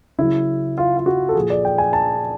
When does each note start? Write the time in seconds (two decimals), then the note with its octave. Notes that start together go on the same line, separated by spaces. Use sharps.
0.19 C#3 F#3 E4
0.78 F4
0.97 F4
1.06 F#4
1.29 A4
1.35 A#2 F3 G#4
1.50 D5
1.65 G5
1.78 G#5
1.93 A5